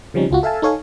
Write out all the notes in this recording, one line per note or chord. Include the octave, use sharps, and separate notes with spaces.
C#3 F3 G3 C4 C#4 D#4
C#2 F4 F#4
A4 E5 F5 G#5 A5
D#4 A4 C#5 F5 G#5